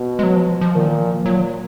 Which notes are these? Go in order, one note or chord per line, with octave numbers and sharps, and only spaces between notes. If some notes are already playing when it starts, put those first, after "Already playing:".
Already playing: B2
G#3
F#3
F3
F3
A#2 D#3
F3
A#2 F#3